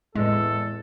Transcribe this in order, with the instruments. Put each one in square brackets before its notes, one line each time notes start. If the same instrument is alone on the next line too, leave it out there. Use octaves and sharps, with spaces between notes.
[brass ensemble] E2 [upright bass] A2 C4 [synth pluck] G#3 [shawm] A4